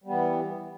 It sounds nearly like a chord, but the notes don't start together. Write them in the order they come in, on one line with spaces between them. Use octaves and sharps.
G3 B3 E3